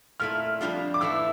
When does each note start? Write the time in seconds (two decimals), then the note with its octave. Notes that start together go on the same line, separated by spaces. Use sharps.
0.20 A#2 A3 E4 F6
0.61 F2 C3 G3 D4 F4
0.94 D6
1.01 A2 E3 A3 E4 E6